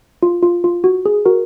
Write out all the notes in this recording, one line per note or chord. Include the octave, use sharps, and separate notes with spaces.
F4
F4
F4
F#4
G#4
F#4 A#4